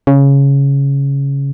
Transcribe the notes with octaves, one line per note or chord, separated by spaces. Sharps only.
C#3